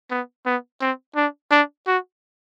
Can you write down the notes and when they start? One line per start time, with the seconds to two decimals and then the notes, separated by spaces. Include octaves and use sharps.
0.10 B3
0.46 B3
0.81 C4
1.16 D4
1.51 D4
1.87 F#4